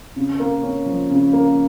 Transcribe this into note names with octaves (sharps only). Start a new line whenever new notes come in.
C#3
A#3
C#4
F3
C#3
A#3